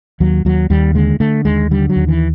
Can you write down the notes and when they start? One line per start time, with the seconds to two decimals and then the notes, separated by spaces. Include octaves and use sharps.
0.20 D#2 F#3
0.45 D#2 F#3
0.70 D#2 G3
0.95 D3 G#3
1.20 D3 A3
1.45 D#2 G#3
1.71 D3 G3
1.90 F#3
1.96 D#2
2.08 E3